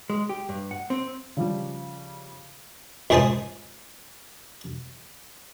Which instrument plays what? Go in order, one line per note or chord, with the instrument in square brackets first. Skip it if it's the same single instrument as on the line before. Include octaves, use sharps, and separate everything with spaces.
[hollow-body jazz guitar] G#3
G4
G2
F#5
C4
[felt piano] C#3 F3 G3
[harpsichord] C#2 G#2 G#4 C5 A5 D#6